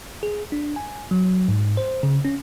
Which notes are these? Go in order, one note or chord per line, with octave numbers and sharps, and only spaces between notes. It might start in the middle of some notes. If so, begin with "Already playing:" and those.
G#4
D4
G#5
F#3
G#2
C5
C#3
C#4